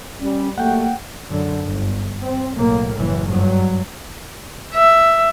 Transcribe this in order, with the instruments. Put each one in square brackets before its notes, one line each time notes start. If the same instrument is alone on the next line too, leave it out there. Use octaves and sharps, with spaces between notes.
[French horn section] G3 [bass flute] C#4
[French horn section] F#3 G3 A3 [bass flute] A#3 [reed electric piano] F#5 G5
[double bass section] F#2 D3
G1
C4
B1 A2 A#3
F#1 E3
G2 F#3
[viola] E5